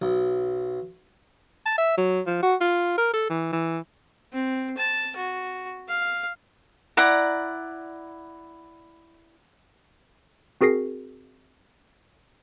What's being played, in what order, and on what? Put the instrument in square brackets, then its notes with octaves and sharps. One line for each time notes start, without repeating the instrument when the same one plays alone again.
[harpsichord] B1
[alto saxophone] A5
E5
F#3
F3
F#4
F4
A#4
A4
E3
E3
[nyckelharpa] C4
A5
F#4
F5
[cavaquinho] E4 D5 F#5 A#5
[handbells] C4 F#4 G#4 A#4 A#6 C7